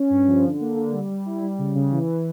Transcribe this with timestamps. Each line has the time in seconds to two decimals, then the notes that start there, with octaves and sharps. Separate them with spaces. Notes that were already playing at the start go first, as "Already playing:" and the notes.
Already playing: C#4
0.10 G2
0.27 F3
0.43 D3
0.60 A#3
0.76 D3
0.92 G3
1.10 G3
1.26 E4
1.42 G3
1.58 C#3
1.75 C#3
1.92 E3